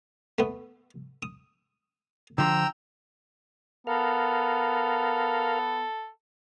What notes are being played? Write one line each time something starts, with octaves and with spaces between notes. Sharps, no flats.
A3 B3
D#6
D3 F3 G5 A#5 E6
B3 A4 A#4 F5